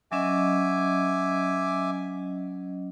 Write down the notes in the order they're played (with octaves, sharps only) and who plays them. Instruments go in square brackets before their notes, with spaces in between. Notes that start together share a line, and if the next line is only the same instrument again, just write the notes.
[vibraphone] F#3 C#4 D#5 [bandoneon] E5 G#5 D6